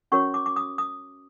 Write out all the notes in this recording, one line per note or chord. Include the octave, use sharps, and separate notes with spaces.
C#4 F#4 A#4 C#5 C#6
D6
D6
D#6
D#6